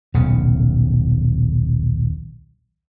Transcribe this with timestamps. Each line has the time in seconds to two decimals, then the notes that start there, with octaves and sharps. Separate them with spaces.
0.14 D#1 B1 C#3